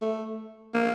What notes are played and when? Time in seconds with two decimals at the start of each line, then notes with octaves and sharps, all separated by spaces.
0.02 A3
0.74 A#3